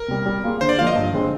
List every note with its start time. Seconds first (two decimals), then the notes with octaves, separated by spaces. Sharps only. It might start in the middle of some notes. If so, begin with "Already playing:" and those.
Already playing: A#4
0.08 C3 G3
0.26 G3
0.44 A#3 F4 G#4
0.61 D3 C5
0.69 D5
0.78 F3 A#3 F4 F5
0.87 D#5
0.96 G2
1.12 D3 G#3 C4